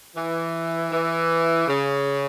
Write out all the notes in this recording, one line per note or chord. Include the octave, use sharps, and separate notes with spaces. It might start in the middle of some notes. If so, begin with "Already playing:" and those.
E3
E3
C#3